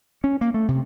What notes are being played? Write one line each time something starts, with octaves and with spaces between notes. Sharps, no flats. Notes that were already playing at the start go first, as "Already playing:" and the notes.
C#4
A#3
A3
C3